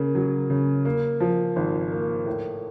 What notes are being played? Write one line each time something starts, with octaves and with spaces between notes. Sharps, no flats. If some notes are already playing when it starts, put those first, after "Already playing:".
Already playing: C#3 A#3
F#3
C#3
A#3
F3
G#1
A#3
A2